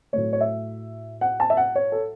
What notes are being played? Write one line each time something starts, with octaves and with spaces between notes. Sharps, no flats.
A2 F#3 A3 C#5
C#5
E5
F#5
A5
E5
F#5
C#5
A4